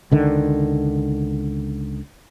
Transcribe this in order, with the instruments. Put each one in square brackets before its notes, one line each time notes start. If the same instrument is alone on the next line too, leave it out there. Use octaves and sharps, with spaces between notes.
[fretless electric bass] C#2 D3 D#3